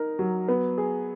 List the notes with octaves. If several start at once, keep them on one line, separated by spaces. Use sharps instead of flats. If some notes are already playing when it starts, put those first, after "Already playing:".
Already playing: D#4 A#4
F#3
B3
G#4